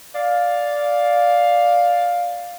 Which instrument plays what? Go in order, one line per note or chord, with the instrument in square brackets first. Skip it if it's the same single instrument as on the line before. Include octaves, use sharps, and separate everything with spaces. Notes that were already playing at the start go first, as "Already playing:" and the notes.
[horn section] D5 F5